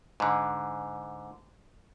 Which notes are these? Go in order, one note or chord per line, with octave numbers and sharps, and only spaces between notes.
G#2 D3